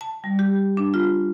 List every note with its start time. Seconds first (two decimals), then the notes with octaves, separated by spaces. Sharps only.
0.01 A5
0.24 G3
0.39 G4
0.77 D4
0.94 F4